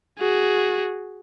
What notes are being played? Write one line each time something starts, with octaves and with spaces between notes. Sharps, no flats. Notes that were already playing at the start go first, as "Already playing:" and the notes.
F#4 G#4